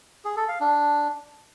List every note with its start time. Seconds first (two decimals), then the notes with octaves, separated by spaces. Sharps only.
0.25 G#4
0.37 A4
0.48 F5
0.60 D4